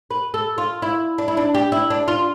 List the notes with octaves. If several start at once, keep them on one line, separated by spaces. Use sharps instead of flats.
B4
A4
F4
E4
D4
E4
D4
G4
E4
D4
F4